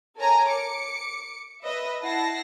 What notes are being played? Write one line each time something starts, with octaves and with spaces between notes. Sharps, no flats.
A4 A#4 C#5 G#5 A#5
D6 C#7
B4 D#5 E5
E4 F#5 A5 A#6 C7